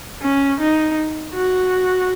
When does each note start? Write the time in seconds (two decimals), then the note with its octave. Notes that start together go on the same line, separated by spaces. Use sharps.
0.22 C#4
0.60 D#4
1.34 F#4